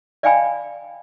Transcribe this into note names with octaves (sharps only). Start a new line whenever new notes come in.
D5 D#5 F5 G5 G#5 B5